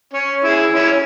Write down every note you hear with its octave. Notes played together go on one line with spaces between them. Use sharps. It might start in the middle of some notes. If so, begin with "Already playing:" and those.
C#4
E4 G#4
C#4 E4